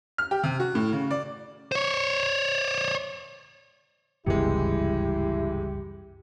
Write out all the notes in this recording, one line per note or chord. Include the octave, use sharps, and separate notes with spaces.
F6
G4
C3
F#4
A2
C#3
D5
C5 C#5
F#1 C#2 G2 C3 E3 G#3 E4 G4